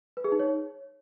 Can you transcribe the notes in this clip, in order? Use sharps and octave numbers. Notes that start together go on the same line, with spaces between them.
B4
G#4
D#4
C#5